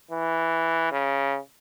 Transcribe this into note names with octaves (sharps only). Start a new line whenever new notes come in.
E3
C#3